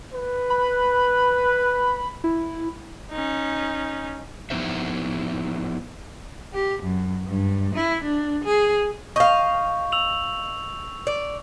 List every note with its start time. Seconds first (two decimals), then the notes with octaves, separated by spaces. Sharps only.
0.14 B4
0.50 B5
2.24 E4
3.11 C#4 D#4
4.50 F3 B3 D#4 E4 C5 E5
6.54 G4
6.83 F#2
7.26 G2
7.75 E4
8.04 D4
8.44 G#4
9.16 D#5 F5 C#6 G6
9.92 E6 F7 F#7
11.07 D5